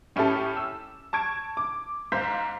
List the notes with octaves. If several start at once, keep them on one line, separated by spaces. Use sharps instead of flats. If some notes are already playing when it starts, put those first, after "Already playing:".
A2 C#4 E4 G4 A4
E6
A5 C#6 G#6 D7
D6
G#2 C5 F5 G6 B6